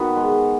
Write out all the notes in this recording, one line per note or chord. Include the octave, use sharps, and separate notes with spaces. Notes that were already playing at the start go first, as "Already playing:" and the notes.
Already playing: D#3 B3 F#4
G#3